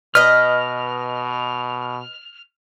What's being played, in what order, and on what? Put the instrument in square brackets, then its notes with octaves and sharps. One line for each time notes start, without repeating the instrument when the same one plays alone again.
[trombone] B2 [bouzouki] B4 D#5 [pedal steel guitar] F6